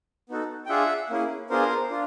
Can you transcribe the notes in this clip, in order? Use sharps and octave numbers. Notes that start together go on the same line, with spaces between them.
B3 D#4 F#4 A4
G5
D4 F4 G#4 E5 F#5
A#3 C#4 E4 G#4
B3 D4 F4 G#4 A#4 C5
D4 F4